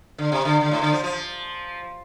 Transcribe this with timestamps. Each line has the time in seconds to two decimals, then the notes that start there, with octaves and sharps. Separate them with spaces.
0.18 D3
0.32 C3
0.45 D3
0.61 D3
0.71 A2
0.82 D3
0.93 F3
1.04 F3